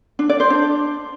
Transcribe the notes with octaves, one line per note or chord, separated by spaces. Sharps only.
D4
D5
C5
D4